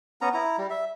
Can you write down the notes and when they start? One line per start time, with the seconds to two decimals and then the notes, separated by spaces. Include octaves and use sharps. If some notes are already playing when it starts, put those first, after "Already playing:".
0.21 B3 C#4 A#5
0.34 E4 A#5
0.58 G3
0.70 E5